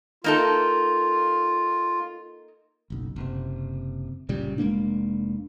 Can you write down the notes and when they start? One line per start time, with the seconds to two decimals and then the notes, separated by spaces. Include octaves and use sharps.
0.24 A#3 D#4 F4 A4
2.90 F#1 B1
3.16 F#1 C3
4.29 F#1 A#2 C#3 G3
4.58 F1 G#3 A#3 D4